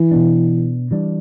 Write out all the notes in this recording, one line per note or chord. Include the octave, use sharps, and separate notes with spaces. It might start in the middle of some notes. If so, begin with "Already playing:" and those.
Already playing: E3
B2 B3 D4
E3 G3 D4